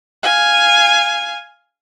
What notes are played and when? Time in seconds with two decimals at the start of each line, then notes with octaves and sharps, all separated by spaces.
0.23 F5 G#5